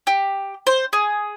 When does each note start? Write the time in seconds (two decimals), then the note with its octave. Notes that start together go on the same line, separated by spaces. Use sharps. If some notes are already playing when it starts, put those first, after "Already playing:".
0.07 G4
0.67 C5
0.93 G#4